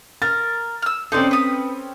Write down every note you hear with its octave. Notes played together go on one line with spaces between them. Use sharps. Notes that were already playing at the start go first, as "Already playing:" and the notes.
A#4 A6
E6 F6
C4 C#4 D#4 A4 C5 D5
B4 D#6